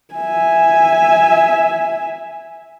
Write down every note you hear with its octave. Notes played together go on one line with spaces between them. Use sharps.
E5 G#5